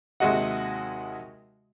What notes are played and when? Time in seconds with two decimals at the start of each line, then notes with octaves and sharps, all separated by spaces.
0.20 D#2 C3 G#3 F#4 D#5 F#5